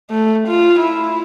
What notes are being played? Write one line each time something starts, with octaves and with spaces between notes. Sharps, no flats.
A3
F4
E4